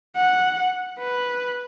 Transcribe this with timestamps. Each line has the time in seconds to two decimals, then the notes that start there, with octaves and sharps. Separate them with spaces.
0.16 F#5
0.99 B4